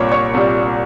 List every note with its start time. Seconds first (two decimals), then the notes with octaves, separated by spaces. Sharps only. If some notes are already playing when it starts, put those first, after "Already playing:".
Already playing: C2 A#2 G3 C#5 C#6 D6
0.12 C#5 C#6
0.34 C2 A#2 G3